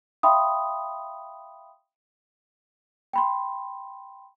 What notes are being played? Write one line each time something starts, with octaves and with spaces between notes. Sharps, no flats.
E5 F5 G5 B5 C6 D#6
G5 B5 C6